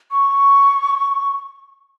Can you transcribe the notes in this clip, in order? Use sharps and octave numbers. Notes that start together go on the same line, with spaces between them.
C#6